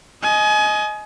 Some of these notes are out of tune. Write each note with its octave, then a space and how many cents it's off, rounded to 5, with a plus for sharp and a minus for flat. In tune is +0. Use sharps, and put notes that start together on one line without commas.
D#5 +5 G#5 +30